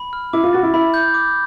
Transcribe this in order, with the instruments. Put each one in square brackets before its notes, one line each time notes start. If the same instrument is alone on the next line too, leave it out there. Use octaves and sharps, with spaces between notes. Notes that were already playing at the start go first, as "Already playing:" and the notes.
Already playing: [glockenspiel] B5
F6
[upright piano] E4 [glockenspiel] D6
[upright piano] F4
[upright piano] F#4 [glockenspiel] A6
[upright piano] E4
[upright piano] E4 [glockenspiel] B5
[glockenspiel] G6
D6